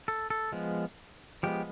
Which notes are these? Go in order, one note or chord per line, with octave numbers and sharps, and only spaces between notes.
A4
A4
F3 G#3 B3
F3 G#3 B3 G4